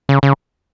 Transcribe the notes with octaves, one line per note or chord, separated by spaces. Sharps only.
C#3
C#3